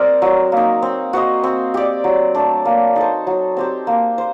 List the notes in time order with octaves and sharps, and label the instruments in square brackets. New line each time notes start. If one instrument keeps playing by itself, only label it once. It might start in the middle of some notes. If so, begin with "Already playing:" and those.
Already playing: [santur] G3 C4 G4 A#4 C5 D#5
F#3
A#3 D#4
C4
F#4 C5 D#5
C4
G4 D5
F#3
A3 D4
A#3
D#4 A4 C5
F#3
C4 G4 C5
A#3
C5